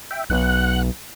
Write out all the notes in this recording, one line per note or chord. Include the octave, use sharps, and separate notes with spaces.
E5 G5
B1 F#5 F#6